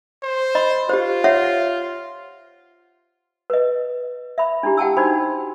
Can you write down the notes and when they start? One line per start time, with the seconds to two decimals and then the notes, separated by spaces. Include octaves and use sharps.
0.23 C5
0.55 D#5 B5
0.89 F4 G4 C5
1.24 C#5 E5 F#5
3.50 B4 D#5
4.38 E5 B5
4.63 D4 E4 G4
4.77 F#5 G5 A5 E6
4.97 D4 D#4 F#4 C5 B5